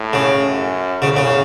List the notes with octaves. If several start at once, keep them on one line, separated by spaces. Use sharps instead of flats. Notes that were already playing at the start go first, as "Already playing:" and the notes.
Already playing: A2
C#3
F#2
E2 C#3
C#3